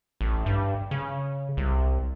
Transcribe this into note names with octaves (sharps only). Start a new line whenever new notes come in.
A1
G2
C#3
C2